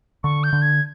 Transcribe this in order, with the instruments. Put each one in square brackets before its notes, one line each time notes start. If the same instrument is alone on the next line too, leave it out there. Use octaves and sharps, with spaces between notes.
[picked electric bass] D3 [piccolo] C#6
[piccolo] G6
[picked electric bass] D3
[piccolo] G#6